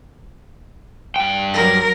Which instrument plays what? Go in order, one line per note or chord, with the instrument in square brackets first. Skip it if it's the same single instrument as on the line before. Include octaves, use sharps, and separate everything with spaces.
[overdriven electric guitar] G2 G5
[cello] F#3 A#4